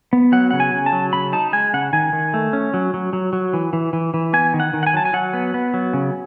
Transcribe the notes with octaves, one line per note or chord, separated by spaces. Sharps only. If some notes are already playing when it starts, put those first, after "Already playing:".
B3
F#3 F#5
C#3 F#5
G#5
C#3
A5
F#3
C#3 B5
D#4 A5
G#3 G#5
C#3 F#5
D#3 G#5
D#3
A3
C#4
F#3
F#3
F#3
F#3
E3
E3
E3
E3
B3 G#5
D#3
F#5
D#3
F#5
G#5
F#3 A5
G#5
F#3 F#5
B3
B3
F#3
C#3